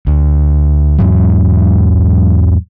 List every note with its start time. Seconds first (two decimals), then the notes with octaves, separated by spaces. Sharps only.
0.07 D2
0.98 E2 G#2 F#3